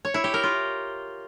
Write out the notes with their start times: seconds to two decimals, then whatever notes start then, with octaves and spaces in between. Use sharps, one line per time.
0.05 C#5
0.14 E4
0.24 G4
0.34 A#4
0.43 F4